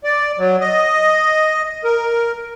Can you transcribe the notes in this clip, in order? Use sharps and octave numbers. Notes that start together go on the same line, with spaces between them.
D5
F#3
D#5
A#4